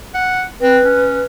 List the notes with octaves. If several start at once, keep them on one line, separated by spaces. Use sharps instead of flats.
F#5
C4 B4
C#4